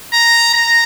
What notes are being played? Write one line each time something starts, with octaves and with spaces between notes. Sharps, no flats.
A#5
A#5